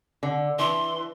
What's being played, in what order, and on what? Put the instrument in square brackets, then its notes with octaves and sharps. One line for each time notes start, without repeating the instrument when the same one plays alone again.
[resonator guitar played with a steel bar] D3
[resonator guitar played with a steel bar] E3 [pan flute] C6